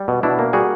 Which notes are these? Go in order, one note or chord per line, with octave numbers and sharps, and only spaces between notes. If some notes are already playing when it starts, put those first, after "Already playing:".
Already playing: G3
B2
B2 D4 E4
A#3
G3 F#4 G#4